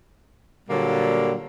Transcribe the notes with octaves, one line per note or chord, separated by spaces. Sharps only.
A#2 D3 F#3 G3 A#3